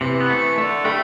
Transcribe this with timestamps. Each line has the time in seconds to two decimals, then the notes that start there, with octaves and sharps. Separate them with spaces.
0.01 C3 E3
0.20 B3
0.30 A3
0.58 D3 A3
0.85 G3 A3